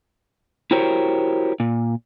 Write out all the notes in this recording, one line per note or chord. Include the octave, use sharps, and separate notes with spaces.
E4 F#4 G4 A#4 C5 C#5
A#2